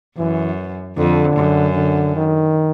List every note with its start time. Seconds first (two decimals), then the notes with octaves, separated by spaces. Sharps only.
0.17 F#2 E3
0.97 F2 D3
1.36 F#2
1.76 D3
2.16 D#3